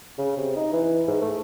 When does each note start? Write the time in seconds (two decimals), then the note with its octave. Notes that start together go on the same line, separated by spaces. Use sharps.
0.18 C#3
0.37 C3
0.56 D#4
0.72 E3
1.08 G#2
1.21 A3